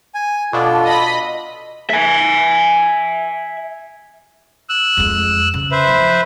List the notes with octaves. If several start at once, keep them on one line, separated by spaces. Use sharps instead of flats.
G#5
B2 D4 F4 A4
D#5 B5
E5 G#5
E6 F#6
F2 G#3
C#3
B4 C5 E5
F3